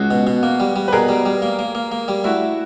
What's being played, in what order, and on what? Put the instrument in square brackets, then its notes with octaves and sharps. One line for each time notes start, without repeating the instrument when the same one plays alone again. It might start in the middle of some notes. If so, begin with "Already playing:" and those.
Already playing: [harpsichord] C#2 [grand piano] F#4 G#4
[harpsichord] B2
B2
A#3
G3
G3
[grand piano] B4
[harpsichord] B2 [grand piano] G#4 A#4
[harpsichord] G3
G3
A#3
A#3
A#3
A#3
G3
[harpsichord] A3 [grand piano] E4 F#4